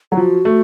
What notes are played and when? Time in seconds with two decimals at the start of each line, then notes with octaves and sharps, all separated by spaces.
0.12 F#3 A4
0.17 F3 F#4
0.45 A3